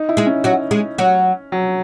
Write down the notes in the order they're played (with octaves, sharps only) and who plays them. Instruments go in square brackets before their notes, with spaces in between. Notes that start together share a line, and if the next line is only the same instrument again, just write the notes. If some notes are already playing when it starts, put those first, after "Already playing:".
Already playing: [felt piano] D#4
E4
[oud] G#3 G#4
[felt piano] C#4
[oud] F#3 F#4
G#3 G#4
F#3 F#4
[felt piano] F#3